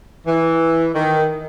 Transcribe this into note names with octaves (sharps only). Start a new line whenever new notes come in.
E3
D#3